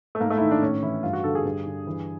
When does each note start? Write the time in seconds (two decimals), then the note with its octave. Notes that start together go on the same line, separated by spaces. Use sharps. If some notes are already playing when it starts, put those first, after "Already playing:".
0.15 A3
0.20 G#2 A#3
0.30 A3
0.37 E4
0.41 D#3 D#4
0.51 D4
0.62 A2 C#4
0.83 E3 E4
1.03 G2 F4
1.13 F#4
1.24 D3 A4
1.35 G#4
1.45 G2
1.66 D3
1.87 E3